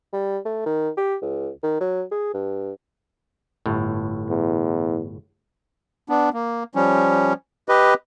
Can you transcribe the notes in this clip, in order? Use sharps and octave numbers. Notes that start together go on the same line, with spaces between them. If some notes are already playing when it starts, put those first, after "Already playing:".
G3
A3
D#3
G4
C#2
D#3
F#3
G#4
G2
G1 A2
E2
B3 D4
A#3
F3 G3 C#4
G4 B4 D#5